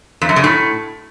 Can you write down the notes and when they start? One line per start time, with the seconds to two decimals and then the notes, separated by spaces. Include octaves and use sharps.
0.22 F2
0.29 F#2
0.36 C#3
0.44 A2